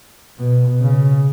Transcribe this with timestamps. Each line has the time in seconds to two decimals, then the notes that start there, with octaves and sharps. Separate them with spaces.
0.38 B2
0.80 C#3